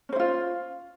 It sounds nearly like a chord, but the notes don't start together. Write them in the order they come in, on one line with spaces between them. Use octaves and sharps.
C#4 C5 E4 F4